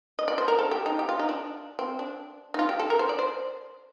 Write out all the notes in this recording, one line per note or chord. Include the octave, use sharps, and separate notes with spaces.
D#5
D5
C5
A#4
A4
G4
D#4
G4
F4
D#4
D4
C4
D4
D#4
F4
G4
A4
A#4
C5
D5
C5